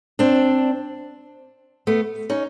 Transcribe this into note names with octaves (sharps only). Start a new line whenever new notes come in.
C4 D4
A3 B3
C#4 D#4